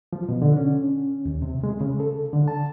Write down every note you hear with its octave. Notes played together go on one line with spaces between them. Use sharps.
F3
B2
D3
C#4
D#2
C3
G#3
C#3
A4
D3
A5